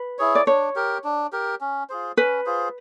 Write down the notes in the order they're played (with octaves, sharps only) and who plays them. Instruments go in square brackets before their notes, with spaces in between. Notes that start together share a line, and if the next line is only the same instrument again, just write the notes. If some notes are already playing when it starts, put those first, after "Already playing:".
Already playing: [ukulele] B4
[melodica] E4 G#4 C#5
[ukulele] D5
[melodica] D4 [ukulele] C#5
[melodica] G4 A#4
D4
G4 A#4
C#4
F4 G#4 C5
[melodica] C#4 [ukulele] B4
[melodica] F4 G#4 C5